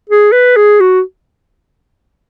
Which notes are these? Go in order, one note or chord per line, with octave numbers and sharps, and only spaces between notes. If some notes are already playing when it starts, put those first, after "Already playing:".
G#4
B4
G#4
F#4